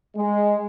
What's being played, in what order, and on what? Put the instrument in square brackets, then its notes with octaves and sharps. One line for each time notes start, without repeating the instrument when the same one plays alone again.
[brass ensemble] G#3